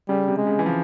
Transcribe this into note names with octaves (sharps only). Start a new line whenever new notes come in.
C#3 G3
C3
G#3
C#3
E3
F3